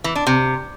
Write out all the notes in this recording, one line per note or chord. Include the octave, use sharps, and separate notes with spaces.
E3
D4
C3